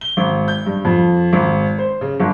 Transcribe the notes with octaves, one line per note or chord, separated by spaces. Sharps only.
G7
G#1
G6
G2
F2
G#1
C5
C#3
G1